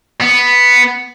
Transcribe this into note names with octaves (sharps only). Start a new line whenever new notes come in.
B3